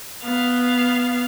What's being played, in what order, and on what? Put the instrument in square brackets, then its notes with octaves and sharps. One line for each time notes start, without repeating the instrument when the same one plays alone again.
[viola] B3 F5